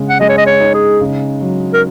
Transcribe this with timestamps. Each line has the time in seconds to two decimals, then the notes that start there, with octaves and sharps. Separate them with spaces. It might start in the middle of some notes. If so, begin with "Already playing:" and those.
Already playing: C#3 G#3
0.09 F#5
0.20 G#3 D#5
0.29 C#5
0.38 D#5
0.46 C#5
0.60 D#4
0.74 G#4
1.01 C#3
1.41 F#3
1.73 A#4